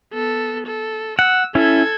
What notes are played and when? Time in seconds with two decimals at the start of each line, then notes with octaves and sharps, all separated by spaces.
0.13 B3 A4
0.66 A4
1.19 F#5 E6
1.55 C#4 E4 A4 G#6